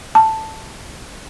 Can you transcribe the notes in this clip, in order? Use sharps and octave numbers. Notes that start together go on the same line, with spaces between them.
A5